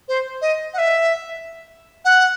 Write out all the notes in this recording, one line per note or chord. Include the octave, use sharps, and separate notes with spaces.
C5
D#5
F#5
E5
F#5